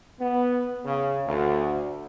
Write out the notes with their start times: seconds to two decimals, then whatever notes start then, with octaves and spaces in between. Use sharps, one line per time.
0.19 B3
0.85 C#3
1.27 D2